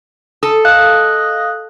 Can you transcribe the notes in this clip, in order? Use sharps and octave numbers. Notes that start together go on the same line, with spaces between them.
A4 D#6
D#5 F5 F#6